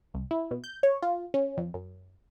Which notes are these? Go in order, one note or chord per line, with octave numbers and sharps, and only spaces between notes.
C2
E4
B2
G6
C#5
F4
C#4
F2
F#2